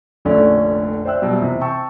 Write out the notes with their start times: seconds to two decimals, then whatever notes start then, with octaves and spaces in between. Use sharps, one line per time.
0.25 F1 A#1 D3 A3 C#4 D5
1.05 C5 D5 E5 G5 E6 F#6
1.22 B2 F#3 G3
1.42 C3 E3
1.61 G5 A5 C#6 E6